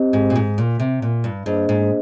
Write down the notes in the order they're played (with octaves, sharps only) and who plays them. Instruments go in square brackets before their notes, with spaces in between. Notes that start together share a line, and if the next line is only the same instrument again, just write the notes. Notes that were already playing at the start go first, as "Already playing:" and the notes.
Already playing: [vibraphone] C4 G4 C5 D#5
[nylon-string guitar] G#2
A#2
G#2
A#2
C3
A#2
G2
[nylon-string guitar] G2 [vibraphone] A#3 D4 G#4 C5 D#5
[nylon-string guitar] G#2